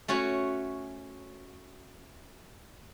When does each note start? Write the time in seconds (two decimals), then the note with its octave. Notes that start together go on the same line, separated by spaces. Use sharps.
0.08 A3 C#4 F#4 C#5